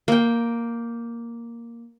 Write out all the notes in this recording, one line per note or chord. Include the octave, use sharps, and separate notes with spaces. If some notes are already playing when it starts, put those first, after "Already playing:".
A#3 G5